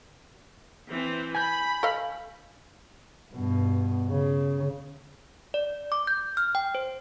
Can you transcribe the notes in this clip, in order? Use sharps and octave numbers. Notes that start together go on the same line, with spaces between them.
E3 C4
G#5 B5 G6
A4 D#5 F5
G2 B2
C#3
D5
D6
G6
F6
G5
C5